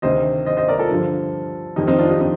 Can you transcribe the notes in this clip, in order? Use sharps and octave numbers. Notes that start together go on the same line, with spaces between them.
D2 C3 D#3 C5 D#5
C5 D#5
C5 D#5
A#4 D5
F4 A4
G2 D3 F3
F2 D#3 G3 D#4 G4
C4 D#4
D4 F4
D#4 G4
C4 D#4